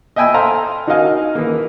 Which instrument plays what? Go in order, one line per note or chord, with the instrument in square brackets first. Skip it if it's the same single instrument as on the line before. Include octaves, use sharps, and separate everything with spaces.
[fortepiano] D#5 E5 G5 G#5 B5 E6
A4 C5 F5 A#5 C6
D#4 F#4 A#4 D#5 F5 G#5
E3 A#3